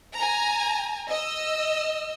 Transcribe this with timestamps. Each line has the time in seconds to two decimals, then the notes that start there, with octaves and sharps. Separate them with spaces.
0.16 G#5 A#5
1.10 D#5 E6